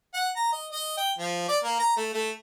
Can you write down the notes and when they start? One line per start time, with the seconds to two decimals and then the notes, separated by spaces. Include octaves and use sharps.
0.14 F#5
0.36 A#5
0.52 D#5
0.72 D#5
0.97 G5
1.18 F3
1.48 D5
1.64 A#3
1.80 A#5
1.97 A3
2.14 A3